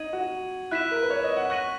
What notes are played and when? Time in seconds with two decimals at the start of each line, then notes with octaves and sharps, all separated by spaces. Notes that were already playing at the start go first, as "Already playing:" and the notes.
Already playing: D#4 G#6 D#7 F#7
0.13 F#4
0.71 E4 F#6 B6 E7
0.91 A#4
1.03 B4
1.10 C#5
1.24 D#5
1.37 F#5
1.50 F#5 C#6 F#6 A#6 D#7 F#7